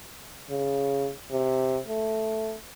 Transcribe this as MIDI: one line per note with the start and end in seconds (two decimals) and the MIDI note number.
0.50 1.09 49
1.31 1.79 48
1.88 2.55 57